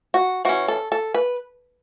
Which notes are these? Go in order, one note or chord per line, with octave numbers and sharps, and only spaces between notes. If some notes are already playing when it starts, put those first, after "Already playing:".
F#4
E3 C#4 F#4
A4
A4
B4